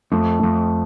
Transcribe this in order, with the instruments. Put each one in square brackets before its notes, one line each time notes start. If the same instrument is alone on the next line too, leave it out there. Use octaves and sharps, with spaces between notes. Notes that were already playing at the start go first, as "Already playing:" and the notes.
[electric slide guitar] F2 [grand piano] A3
[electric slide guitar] F2 [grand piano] A3